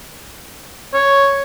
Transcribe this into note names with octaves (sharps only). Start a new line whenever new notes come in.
C#5